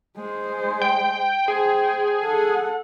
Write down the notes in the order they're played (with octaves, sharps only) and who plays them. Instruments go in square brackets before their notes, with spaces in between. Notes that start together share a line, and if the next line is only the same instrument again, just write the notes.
[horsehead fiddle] G#3 C5
[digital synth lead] G5
[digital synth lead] G#4 [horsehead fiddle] C5 G5
[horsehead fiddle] A4 F#5